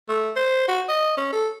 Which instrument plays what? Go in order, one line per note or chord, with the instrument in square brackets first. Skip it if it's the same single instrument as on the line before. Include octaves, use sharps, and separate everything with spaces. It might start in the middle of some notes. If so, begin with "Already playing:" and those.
[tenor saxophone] A3
C5
F#4
D#5
C#4
A4